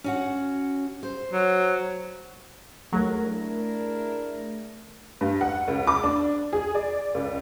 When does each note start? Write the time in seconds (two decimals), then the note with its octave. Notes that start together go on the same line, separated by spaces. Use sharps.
0.04 C#4 F#4 F#5
1.03 C5
1.32 F#3
2.93 D#2 F#3 A3 G#4 A#4 A#6
3.22 D4 E4 A#4
5.21 G2
5.41 F#5
5.68 C#2
5.87 D6
6.03 D4
6.53 G#4
6.75 D5
7.14 C#2